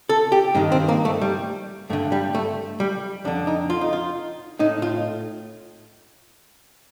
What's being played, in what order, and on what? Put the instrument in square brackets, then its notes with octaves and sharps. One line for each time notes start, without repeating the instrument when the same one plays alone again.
[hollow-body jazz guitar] A4
G4
G2 D#3 D#4
C4
A#3
A3
G3
G2 A3
D3
G3
A3
G3
F2 D4
D3
D#4
F4
D#4
F4
A2 D#4
F4